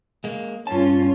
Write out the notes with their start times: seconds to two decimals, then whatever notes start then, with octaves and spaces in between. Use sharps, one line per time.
0.24 G#3 A#3
0.67 G2 C#4 F4 A5